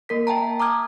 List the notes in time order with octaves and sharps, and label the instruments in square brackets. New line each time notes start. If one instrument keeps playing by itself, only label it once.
[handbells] A#3 A#4 B6
E5 G5 A5 A#5
A#5 D6 D#6 F6 G#6